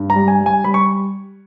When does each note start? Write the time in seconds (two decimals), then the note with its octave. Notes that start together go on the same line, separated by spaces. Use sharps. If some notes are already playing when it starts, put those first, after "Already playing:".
Already playing: G2
0.10 A#5
0.15 G3
0.28 G#5
0.40 G3
0.46 G#5
0.64 G3 B5
0.74 C#6